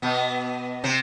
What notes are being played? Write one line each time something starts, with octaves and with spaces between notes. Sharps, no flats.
B2 B3
C3 C4